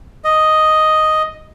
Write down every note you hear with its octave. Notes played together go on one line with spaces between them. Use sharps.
D#5